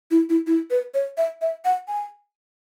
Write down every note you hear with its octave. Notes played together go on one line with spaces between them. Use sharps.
E4
E4
E4
B4
C#5
E5
E5
F#5
G#5